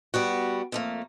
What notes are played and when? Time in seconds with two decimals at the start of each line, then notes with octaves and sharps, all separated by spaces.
0.14 G3 B3 F#4
0.72 F2 A3 A#3